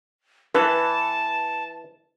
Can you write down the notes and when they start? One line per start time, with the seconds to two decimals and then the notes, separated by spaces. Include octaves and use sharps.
0.54 E3 B4 A5